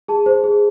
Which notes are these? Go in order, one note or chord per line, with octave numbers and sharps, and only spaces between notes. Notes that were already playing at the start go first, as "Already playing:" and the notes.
G#4 A5
C5
G#4